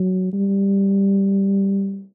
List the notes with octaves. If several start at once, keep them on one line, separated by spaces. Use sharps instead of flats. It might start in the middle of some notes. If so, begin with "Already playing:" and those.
Already playing: F#3
G3